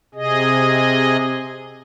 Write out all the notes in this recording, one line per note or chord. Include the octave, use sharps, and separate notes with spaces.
C3 G#4 D#5